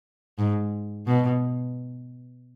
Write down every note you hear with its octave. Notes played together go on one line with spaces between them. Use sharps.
G#2
B2